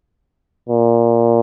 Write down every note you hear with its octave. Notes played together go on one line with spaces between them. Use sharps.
A#2